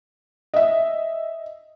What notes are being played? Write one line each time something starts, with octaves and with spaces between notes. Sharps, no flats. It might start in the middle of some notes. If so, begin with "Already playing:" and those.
D#5 E5